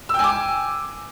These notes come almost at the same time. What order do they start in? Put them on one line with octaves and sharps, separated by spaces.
E6 G5 G#5 D6